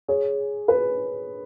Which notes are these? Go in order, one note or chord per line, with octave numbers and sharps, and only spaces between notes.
G#4 C#5
B4